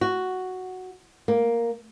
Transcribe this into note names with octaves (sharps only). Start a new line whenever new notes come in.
F#4
A#3